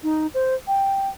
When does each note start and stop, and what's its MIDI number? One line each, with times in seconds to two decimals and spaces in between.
0.03 0.27 63
0.34 0.55 72
0.68 1.08 79